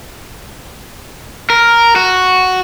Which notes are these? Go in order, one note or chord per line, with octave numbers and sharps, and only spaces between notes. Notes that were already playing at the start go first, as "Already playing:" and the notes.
A#4
F#4